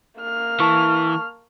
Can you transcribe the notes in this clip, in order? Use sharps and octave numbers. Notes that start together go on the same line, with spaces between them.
A#3 F6
E3 A5 C#6